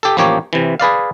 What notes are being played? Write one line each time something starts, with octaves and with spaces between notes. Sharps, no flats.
G4 A4
A1 F3 A#3 G4 C#5
C3 E3
G#4 B4 D5 F5